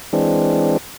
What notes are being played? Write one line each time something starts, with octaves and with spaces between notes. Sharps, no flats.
E3 G#3 C4 D4